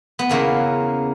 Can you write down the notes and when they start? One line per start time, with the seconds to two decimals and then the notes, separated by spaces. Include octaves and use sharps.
0.19 B3
0.29 E2 C#3 E3 A#3